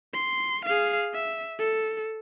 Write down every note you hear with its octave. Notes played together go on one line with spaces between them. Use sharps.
C6
G#4 F5
E5
A4